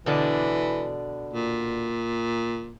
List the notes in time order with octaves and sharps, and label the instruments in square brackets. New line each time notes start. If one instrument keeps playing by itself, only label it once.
[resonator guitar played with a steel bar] B2 D3 D4 [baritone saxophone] E3
[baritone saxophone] A#2